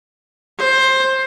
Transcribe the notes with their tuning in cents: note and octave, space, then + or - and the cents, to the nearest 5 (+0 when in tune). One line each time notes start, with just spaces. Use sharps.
C5 +15